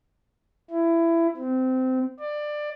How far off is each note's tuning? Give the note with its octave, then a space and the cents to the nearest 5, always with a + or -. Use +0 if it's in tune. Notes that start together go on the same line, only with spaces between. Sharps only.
E4 +20
C4 -20
D5 +20